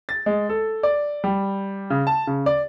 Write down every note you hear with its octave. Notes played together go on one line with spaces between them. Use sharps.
A6
G#3
A4
D5
G3
C#3
A5
C#3
D5